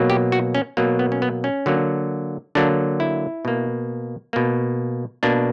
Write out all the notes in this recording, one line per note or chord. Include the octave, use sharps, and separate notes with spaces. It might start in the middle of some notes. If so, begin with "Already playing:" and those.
Already playing: B2 F#3 A#3
G4
F#4
C#4
B2 F#3 A#3
B3
C#4
B3
C#4
D3 F#3 A#3
D3 F#3 A#3 D4
E4
B2 A#3
B2 A#3
B2 A#3 D4